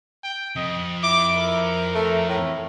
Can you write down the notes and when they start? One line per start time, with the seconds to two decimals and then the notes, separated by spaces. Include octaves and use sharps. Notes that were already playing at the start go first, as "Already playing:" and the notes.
0.24 G5
0.56 F2 D#5
1.03 E4 D6
1.37 A#4
1.95 A3
2.28 A2